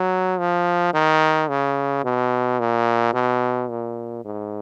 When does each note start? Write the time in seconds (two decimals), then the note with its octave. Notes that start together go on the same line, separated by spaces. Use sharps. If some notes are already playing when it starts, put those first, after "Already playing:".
Already playing: F#3
0.39 F3
0.94 D#3
1.49 C#3
2.04 B2
2.60 A#2
3.14 B2
3.70 A#2
4.25 G#2